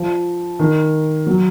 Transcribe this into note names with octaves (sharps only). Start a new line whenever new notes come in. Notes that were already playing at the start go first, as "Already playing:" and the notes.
Already playing: F3
D#3
F#3